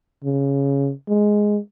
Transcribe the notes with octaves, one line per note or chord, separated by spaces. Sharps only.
C#3
G#3